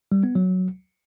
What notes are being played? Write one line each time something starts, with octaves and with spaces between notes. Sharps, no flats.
G3
B3
F#3